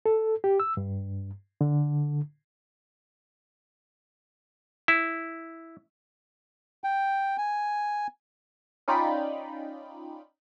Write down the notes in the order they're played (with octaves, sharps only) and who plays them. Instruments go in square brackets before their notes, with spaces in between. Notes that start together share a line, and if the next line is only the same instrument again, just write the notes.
[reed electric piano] A4
G4
E6
G2
D3
[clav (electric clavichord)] E4
[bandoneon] G5
G#5
[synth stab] C#4 D#4 F4 D5 G5 B5